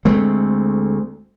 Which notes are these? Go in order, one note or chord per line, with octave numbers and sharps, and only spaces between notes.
D2 G#3 A3 C4